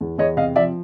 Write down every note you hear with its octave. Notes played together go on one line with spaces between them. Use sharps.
E2
E2 C#5 D#5
C3 D#5 F5
F3 D5 E5